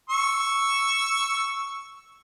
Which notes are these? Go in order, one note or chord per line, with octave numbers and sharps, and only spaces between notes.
C#6 E6